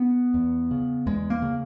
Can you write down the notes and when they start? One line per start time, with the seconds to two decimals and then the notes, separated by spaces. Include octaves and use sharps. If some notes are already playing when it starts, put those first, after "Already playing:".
Already playing: B3
0.34 E2
0.71 C#3
1.06 E2 G#3
1.30 A#3
1.42 C#3